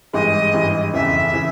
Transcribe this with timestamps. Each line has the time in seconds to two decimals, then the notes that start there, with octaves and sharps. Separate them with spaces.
0.13 G#1 G2 E3 G#3 D#5
0.54 G#1 G2 E3 G#3
0.94 F1 E2 C#3 E3 E5
1.34 C#3 E3